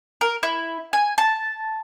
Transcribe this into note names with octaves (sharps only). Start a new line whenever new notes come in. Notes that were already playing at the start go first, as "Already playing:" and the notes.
A#4
E4
G#5
A5